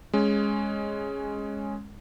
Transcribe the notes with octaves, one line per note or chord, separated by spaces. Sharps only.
G#3 C#4